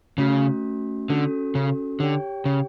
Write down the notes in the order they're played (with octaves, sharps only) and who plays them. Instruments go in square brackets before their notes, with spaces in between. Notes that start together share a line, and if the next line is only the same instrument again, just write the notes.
[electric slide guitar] C#3 [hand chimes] A3 C#4 F#4
[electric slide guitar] D3 [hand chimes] C#4 F#4 A4
[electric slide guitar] C#3
[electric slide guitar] D3 [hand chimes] G4 C#5 G5
[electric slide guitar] C#3